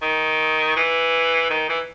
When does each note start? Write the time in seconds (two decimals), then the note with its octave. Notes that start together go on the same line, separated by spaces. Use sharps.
0.02 D#3
0.76 E3
1.50 D#3
1.69 E3